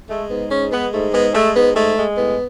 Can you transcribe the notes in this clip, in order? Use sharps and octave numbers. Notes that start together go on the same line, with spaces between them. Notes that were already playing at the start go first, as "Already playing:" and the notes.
G#3 A3
G#2 B3
G#3 C#4
G#3 B3
G#2 A3
G#3 B3
G#3 A3
G#2 B3
G#3 A3
G#3
A2 B3